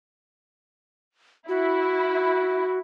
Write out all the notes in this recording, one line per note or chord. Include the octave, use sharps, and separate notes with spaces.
E4 F#4